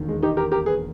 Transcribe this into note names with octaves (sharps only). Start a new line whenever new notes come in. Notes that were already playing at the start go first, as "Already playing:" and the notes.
Already playing: E1 D#2 D#3
G#3
D#4 G4
G4 A#4
G4 A#4
G#4 B4